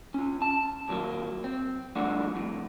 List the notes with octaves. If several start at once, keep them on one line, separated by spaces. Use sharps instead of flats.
C#4 F4
A5
D#2 A#2 F3 F#3 A#3
C4
C#2 G2 F3 A3 D4 F#4
F2 A2